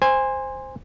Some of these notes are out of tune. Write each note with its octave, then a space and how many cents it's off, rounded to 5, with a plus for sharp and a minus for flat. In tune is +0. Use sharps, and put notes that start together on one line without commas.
C5 +0 G#5 -20